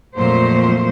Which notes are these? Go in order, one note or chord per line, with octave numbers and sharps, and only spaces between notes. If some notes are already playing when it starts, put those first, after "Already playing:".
F2 A#2 F#3 A3 A#3 C5